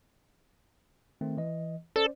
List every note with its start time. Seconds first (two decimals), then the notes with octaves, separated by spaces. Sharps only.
1.21 D#3 A3 C4
1.37 E3 D#5
1.96 C#4 A4 C5 D5